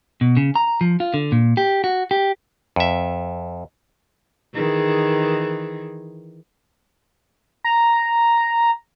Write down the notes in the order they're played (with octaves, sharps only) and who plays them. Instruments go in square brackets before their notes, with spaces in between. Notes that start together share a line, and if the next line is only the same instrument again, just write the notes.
[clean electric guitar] B2
C#3
A#5
F3
F4
D3
A#2
G4
F#4
G4
[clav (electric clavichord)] F2 E5
[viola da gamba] D#3 E3 G#4
[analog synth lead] A#5